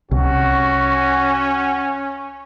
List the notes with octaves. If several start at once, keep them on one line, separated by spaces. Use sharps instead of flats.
C2 C#4 F#4